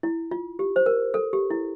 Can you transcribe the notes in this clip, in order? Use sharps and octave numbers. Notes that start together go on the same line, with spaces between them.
E4
F4
G4
C5
A#4
A4
G4
E4